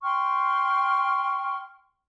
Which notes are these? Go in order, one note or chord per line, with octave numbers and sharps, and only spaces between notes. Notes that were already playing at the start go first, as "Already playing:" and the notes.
G5 C6 C#6 F6